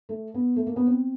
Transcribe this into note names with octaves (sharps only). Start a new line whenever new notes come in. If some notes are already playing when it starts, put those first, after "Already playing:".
A3
B3
A3
A#3
B3
C4